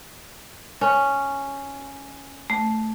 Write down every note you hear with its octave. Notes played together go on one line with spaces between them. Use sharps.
C#4
A3